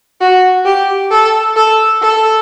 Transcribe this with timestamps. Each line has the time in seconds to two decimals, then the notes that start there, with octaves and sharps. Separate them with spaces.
0.21 F#4
0.65 G4
1.11 A4
1.56 A4
2.02 A4